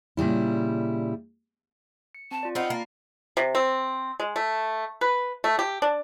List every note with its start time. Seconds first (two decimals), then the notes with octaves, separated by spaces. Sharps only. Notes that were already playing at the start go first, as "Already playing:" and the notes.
0.17 A#2 C#3 G3 E4
2.15 C#7
2.31 C4 A5
2.43 F4 D5
2.55 C4 D#4 F4 F#5 B5
2.70 A#3 D5 A6
3.37 C3
3.55 C4
4.20 G#3
4.36 A3
5.01 B4
5.44 A3
5.59 G4
5.82 D4